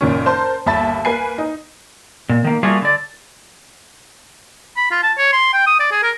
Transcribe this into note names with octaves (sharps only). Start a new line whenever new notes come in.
F#1 A#2 D#3 C#4
A#4 C5 A5 C6
G1 D#2 E5 A5 B5 A6
A#3 B4 G#5 C7
D#4
A#2
D#3 A#3
G3 A3 A#3 F4 F#4 G#4
D3 D5
B5
F4
A5
C#5
C6
G5
D#6
D5
G#4
A#4